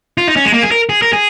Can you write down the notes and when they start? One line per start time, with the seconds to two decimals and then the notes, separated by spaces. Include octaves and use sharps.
0.18 F4
0.28 D#4
0.36 C#4
0.45 G#3
0.53 A#3
0.63 G#4
0.71 A#4
0.89 G#4
1.02 A#4
1.13 G#4